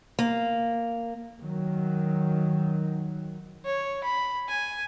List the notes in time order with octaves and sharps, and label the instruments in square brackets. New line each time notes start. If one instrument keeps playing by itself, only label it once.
[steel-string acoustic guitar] A#3
[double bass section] D#3 F#3
[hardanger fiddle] C#5
B5
G#5